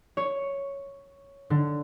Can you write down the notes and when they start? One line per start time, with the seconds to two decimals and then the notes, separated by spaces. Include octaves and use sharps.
0.17 C#5
1.50 D3